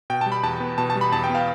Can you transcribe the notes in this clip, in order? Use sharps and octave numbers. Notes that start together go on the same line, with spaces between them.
B2 G5
A5
G3
B5
E2 A5
B3
B2 A5
A5
G3
B5
E2 A5
G5
B3 F5